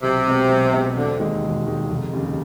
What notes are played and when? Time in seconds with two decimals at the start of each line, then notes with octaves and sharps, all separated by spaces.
0.02 B1 C3
0.26 B2 G#3 C4
0.48 B1
0.73 B2 G#3 C4
0.96 E1 D3
1.20 D#2 D#3 G#3
1.43 E1
1.66 D#2 D#3 G#3
1.89 F1
2.13 D#2 C#3